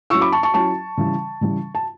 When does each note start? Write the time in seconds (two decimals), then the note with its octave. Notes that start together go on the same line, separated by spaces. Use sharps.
0.10 F#3 C#4 E4 C#6 E6
0.21 B5 D6
0.32 A5 C#6
0.43 A5 C#6
0.54 F#3 C#4 E4 A5 C#6
0.97 C#3 E3 G3
1.41 C#3 E3 G3
1.75 A5